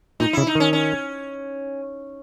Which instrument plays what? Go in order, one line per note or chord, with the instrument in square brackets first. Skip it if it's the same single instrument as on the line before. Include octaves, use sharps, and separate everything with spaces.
[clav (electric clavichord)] A#2 [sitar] D#4
[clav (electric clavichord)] C#3 [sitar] E4
[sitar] D#4
[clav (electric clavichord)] D#3 [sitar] C#4
[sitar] C#4